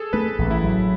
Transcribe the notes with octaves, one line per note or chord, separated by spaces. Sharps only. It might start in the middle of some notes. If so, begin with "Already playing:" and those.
Already playing: G#4 A4
A3 B4
A1
E4
F#3